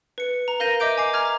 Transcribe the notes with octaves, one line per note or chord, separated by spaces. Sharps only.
B4 C#7
A#5
A#4 F5 G6 A#6 D#7
D#5 E5 D6 G6 D7
G#5 A#5 D6 C7
A#5 D6 F6 G#6